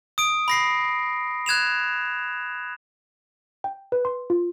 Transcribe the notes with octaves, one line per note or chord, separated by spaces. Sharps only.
D#6 D7
B5 A#6 C7
F#6 G#6 E7 F7
G5
B4
C6
F4